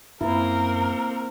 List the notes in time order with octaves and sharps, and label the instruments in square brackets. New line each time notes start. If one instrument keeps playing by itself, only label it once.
[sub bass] F#2 [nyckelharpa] A#3 C4 [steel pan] E4 [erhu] A#4